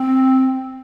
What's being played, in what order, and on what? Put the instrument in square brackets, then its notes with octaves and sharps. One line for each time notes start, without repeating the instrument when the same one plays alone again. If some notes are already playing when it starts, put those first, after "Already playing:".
Already playing: [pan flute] C4